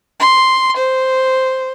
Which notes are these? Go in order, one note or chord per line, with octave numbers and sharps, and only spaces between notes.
C6
C5